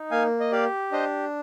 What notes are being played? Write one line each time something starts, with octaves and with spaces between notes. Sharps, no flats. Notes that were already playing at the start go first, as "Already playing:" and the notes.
Already playing: D#4
A#3 F5 G#5
D#5
G4 D5 F5
D4 C5 D#5